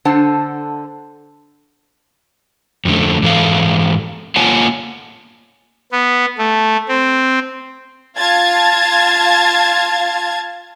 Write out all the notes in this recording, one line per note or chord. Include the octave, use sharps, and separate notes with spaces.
D3 D4 A4 C5 F#5 A5
F2 D3 A3
G#2 E3 A4 F5
A#3 F4 C#5 F#5 G#5 A5
B3
A3
C4
F4 F5 A5 G#6 A6